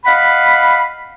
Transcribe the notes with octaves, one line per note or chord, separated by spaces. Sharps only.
D#5 F5 F#5 B5